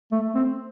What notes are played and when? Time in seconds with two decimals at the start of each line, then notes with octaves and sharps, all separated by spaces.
0.12 A3
0.35 C4